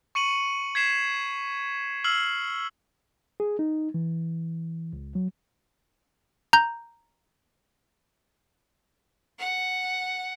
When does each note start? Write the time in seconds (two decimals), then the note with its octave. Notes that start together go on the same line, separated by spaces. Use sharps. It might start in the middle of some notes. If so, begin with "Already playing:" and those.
0.15 C#6 C#7 D#7 F#7
0.75 G#6 B6 C7 E7
2.04 E6 F6 C7 F#7
3.40 G#4
3.59 D#4
3.94 E3
4.93 C#2
5.15 F#3
6.53 A#5 G6
9.39 F#5